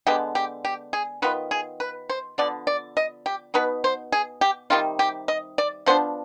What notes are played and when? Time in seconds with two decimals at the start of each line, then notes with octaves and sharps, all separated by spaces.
0.07 D3 G#3 B3 G4
0.35 G4
0.65 G4
0.93 G#4
1.22 D#3 B3 F4 B4
1.51 G#4
1.80 B4
2.10 C5
2.38 D3 F3 B3 D5
2.67 D5
2.97 D#5
3.26 G4
3.54 B2 B3 D#4 B4
3.84 C5
4.12 G#4
4.41 G4
4.70 C3 D#3 G3 F4
4.99 G4
5.28 D#5
5.58 D5
5.86 F3 B3 D4 C5